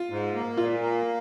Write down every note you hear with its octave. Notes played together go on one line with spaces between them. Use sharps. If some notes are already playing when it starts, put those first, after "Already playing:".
Already playing: F4
G#2
A#3
A#2 F4
A#3